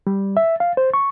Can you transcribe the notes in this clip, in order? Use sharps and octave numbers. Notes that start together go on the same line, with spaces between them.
G3
E5
F5
C5
C#6